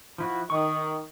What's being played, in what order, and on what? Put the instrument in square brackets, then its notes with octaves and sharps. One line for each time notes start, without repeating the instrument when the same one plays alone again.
[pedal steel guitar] F3 E4 F#4
[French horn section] D#3 [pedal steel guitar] C#6 D#6